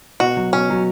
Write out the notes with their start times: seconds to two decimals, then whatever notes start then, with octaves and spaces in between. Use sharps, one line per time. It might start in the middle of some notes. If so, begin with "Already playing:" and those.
0.20 B2 F#4
0.37 F#3
0.53 B2 C#4
0.70 F#3